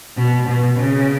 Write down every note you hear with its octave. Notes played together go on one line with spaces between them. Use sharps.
B2
B2
C#3